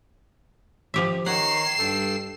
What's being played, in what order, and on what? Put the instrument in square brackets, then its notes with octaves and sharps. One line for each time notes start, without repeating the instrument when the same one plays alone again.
[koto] F3 G4 E5
[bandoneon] D#3 C#5 A#5 [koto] F#5 [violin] C7 E7
[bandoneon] G2 A4 G5